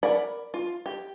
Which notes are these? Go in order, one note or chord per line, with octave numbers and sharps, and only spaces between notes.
A#4 D5 F#5 B5
F4
G4